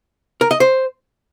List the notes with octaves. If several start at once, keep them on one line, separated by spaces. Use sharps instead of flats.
A#4
D#5
C5